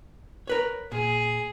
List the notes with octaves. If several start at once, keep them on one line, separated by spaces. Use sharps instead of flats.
A#4 B4 C#5
A#2 G#4